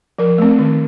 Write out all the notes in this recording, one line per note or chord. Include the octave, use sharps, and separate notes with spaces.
F3 A#4
A3 C4
D#3